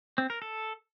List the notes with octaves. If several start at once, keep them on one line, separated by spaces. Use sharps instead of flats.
C4
A#4
A4